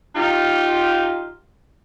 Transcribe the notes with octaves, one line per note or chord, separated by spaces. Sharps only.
D#4 F4 G4